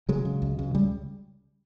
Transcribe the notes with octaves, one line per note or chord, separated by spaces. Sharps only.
C#3 F#3 G#3
C#3
C#2
C#3
C#3 G3